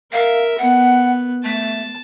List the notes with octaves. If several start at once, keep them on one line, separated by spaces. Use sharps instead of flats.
A#4 E5 F5
B3 F#5
A3 A5